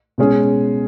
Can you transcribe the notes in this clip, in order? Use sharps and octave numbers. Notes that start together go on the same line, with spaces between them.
B2 G#3 C#4 G#4